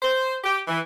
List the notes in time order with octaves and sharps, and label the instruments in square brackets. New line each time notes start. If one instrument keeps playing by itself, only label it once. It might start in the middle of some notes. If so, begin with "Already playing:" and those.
[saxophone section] C5
G4
E3